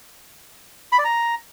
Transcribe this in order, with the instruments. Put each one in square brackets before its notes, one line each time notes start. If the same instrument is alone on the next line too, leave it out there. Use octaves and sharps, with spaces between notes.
[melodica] B5
D5
A#5